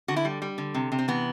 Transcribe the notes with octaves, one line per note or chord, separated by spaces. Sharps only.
D3 F#4
E4
G3
G3
D3
C3
C3
C4
E3 B3